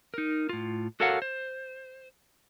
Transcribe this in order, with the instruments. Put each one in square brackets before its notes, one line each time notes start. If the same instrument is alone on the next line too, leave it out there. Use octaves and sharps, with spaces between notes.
[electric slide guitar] D#4 A#4
A2 F4
F#4 A4 A#4 C#5 F5 F#5
C5